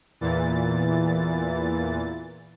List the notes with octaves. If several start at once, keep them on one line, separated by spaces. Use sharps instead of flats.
E2 A#2 E3 A6